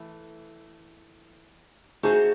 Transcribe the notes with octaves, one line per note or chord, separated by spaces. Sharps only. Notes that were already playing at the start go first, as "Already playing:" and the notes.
Already playing: E3 A3
A3 D#4 F#4 G#4 C5